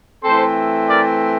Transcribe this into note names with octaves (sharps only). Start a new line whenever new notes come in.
E3 A3 C4 A4 C5
A#4 D5